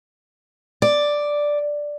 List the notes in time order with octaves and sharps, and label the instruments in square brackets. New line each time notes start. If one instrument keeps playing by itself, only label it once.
[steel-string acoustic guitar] D5